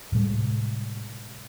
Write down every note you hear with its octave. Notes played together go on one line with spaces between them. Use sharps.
A2 C3 G3 G#3